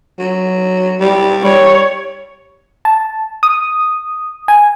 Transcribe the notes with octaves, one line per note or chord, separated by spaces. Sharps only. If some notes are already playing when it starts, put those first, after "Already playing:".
F#3
G3
G3 C#5
A5
D#6
G#5